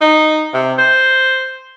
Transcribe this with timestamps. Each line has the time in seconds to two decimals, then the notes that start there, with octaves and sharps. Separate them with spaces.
0.01 D#4
0.54 C3
0.78 C5